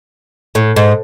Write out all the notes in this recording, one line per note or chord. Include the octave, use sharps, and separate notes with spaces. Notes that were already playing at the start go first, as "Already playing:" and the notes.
A2
G#2